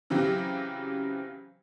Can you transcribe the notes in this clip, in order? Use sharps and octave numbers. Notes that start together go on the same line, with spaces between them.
C#3 E3 F#3 C4 G4